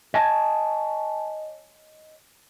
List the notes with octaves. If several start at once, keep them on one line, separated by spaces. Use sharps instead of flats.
C#5 D#5 G#5 A5